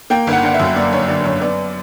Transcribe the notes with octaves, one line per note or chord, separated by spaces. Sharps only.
A#3 G5
G1
F#5
D3 F#5
E5
F#2
A#3 D5
G1 C#5
D3 D5
F#2 C#5
B3 D5